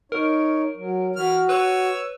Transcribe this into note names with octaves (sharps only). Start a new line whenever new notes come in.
D#4 A#4 C#5
F#3
E3 F#4 F6
B4 C#5 E6